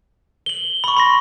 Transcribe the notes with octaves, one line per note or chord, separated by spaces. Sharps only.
F#7 G7
B5 C#6
B5 C6 A#6